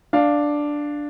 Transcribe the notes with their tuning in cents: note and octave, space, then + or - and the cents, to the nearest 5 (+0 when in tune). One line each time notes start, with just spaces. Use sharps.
D4 +0 F5 +0